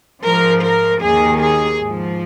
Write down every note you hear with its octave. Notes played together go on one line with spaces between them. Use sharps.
G#2 F3 A#4
A#4
D#2 D#3 G#4
G#4
G#2 F3